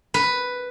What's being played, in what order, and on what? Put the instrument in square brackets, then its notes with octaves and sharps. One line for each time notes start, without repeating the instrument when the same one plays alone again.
[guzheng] B4